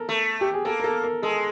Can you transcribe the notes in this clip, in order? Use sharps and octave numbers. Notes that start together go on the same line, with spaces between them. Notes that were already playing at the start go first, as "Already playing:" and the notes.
Already playing: A4 A#4
A3
G4
G#4
A#3 A4
A#4
A4
A#4
G#3 A4